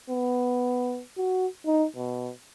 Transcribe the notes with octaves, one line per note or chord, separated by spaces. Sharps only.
B3
F#4
D#4
B2